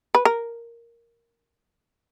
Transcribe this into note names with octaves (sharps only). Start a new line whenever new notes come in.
B4
A#4